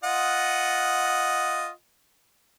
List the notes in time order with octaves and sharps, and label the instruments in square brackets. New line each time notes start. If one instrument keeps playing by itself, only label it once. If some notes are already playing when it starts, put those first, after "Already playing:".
[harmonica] F4 D#5 F#5